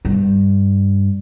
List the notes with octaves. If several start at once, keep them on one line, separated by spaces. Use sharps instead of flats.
G2